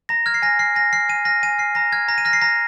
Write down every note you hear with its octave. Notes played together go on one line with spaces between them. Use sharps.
A#5 A#6
F6 G#6
C7
G#5 A#6
F6 C7
G#5 A#6
F6 C7
G#5 D#7
F6 A#6
G#5 D#7
F6 C7
A#5 A#6
F6 G#6
A#5 A#6
D#7
F6 A#6
C7
A#5 A#6